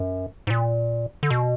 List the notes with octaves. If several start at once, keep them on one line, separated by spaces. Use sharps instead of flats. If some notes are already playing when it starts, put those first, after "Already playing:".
Already playing: F#2
G#2
A#2
D3
B2